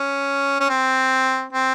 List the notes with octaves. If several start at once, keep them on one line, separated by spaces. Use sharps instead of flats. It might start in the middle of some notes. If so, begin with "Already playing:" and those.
Already playing: C#4
C#4
C4
C4